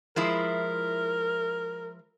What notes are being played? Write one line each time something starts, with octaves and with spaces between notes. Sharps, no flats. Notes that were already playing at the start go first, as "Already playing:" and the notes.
F3 G#3 E4 A#4